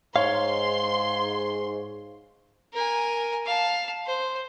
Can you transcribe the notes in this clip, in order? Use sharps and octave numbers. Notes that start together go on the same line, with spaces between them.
G#2 C#5 F5 C6
A#4 G#5
F5 A5
C5